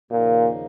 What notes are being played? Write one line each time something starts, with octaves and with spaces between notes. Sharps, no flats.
D#2 A#2 C#3 F3 A#3 D#4